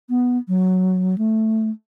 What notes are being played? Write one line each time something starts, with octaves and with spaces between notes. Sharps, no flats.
B3
F#3
A3